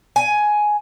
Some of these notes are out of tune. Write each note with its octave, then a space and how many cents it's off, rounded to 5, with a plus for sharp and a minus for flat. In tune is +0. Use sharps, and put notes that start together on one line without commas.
G#5 +10